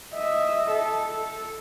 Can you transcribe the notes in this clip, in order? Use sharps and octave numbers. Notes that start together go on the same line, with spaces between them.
D#5 E5
A4